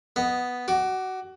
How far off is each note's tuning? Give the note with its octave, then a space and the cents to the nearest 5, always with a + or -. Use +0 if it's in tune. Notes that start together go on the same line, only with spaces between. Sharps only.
B3 +0 D#5 +0
F#4 +20 D6 +0